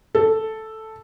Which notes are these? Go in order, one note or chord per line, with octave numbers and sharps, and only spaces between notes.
A4